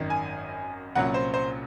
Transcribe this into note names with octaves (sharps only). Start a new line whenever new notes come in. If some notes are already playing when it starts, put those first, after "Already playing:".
Already playing: G#1 F#2 D#3
G#5
C2 A#2 F#3 C#4 F#5
C5
C5